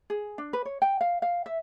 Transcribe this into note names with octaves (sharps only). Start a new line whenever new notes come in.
G#4
D4
B4
C#5
G5
F5
F5
E5